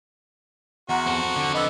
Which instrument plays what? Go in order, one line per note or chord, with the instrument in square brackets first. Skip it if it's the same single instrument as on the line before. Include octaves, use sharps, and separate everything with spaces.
[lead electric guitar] E2 [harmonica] F#4 [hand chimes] F#5 A#5 C6
[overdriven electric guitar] C4 A4
[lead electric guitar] D3
[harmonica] B3 [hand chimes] D#5 E6